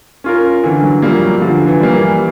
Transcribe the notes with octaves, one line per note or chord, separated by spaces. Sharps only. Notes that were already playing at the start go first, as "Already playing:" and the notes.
C#4 F4 A#4
D3 E3
F#3
F3 G3 A#3
F#3
D3 F3
E3
G3 A#3
E3